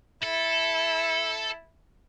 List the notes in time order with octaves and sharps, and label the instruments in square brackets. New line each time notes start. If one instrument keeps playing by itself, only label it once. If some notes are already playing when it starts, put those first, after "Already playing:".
[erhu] E4 [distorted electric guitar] A4